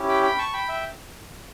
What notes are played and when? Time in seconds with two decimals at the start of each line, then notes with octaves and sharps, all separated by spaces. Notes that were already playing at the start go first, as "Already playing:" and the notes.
Already playing: C#4 E4 G4
0.09 G5 B5
0.23 G5 B5
0.38 A5 C#6
0.53 G5 B5
0.68 E5 G5